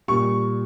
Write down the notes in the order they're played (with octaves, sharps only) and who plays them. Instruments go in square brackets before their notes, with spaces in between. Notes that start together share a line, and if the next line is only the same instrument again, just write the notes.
[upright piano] A#2 G3 C#6